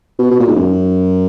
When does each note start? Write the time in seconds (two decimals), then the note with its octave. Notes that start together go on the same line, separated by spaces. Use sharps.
0.19 B2
0.31 B2
0.40 A#2
0.48 G#2
0.56 F#2